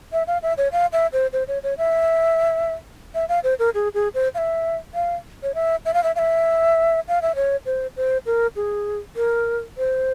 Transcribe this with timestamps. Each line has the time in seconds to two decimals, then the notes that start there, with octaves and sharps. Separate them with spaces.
0.12 E5
0.27 F5
0.43 E5
0.58 C#5
0.72 F5
0.93 E5
1.13 C5
1.33 C5
1.48 C#5
1.63 C#5
1.78 E5
3.15 E5
3.29 F5
3.44 C5
3.59 A#4
3.74 G#4
3.94 G#4
4.14 C5
4.35 F5
4.38 E5
4.94 F5
5.43 C#5
5.55 E5
5.85 E5
5.94 F5
6.03 E5
6.16 F5
6.19 E5
7.08 F5
7.22 E5
7.35 C#5
7.66 C5
7.97 C5
8.26 A#4
8.56 G#4
9.16 A#4
9.78 C5